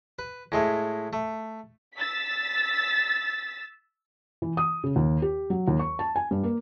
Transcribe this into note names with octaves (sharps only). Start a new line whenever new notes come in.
B4
A2 G#3 A3
A3
E6 A6 B6
E3
D#6
C#3
D#2
G4
F#3
D#2
C#6
A5
G#5
G2
A#3